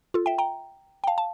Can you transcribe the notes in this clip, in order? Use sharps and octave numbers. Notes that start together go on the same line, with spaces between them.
F4 A4
E5 G5
G5 A#5
G5
F5 A5
A5